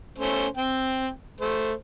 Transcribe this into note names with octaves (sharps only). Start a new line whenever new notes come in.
A3 C#4 C5
C4 G5
A3 C5